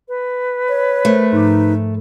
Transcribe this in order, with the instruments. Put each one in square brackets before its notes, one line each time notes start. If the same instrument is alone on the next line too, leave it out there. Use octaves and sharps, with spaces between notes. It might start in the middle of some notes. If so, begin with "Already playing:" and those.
[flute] B4
[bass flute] C#5
[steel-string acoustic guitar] A3 [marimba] A#4 C5
[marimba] G#2 F3 D6 [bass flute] D#4